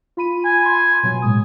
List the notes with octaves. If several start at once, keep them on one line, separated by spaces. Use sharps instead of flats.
F4 B5 D#7
G#5
B5 C6
B2 F#3
A2 G#3 D#6